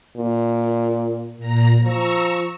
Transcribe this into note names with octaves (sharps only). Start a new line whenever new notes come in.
A#2
A#2 A#5
F3 A#5 C#6 E6